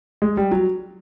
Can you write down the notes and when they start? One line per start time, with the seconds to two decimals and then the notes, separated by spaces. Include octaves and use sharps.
0.22 G#3
0.37 G3
0.51 F#3